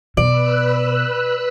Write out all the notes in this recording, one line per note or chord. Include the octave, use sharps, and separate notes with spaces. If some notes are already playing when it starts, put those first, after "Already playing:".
B2 B4 D5 E6 F#6